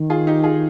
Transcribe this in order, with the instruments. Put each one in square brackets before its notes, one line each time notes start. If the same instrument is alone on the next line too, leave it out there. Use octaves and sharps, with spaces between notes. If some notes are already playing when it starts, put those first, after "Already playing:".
Already playing: [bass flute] D#3
[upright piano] F4 G#4
D#4 G4
F4 G#4